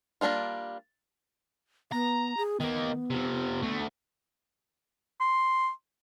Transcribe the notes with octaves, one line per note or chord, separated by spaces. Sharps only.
G3 A#3 D4 D#4 F4
B3 A#5
G#4
D#3 A#3 B3
C3 F3
D2 A3
C6